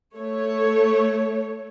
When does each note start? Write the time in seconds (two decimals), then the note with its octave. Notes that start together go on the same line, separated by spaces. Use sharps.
0.17 A3 C#5